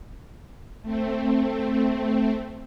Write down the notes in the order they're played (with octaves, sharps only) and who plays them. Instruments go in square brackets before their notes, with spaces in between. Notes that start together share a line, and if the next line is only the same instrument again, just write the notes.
[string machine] A3 C4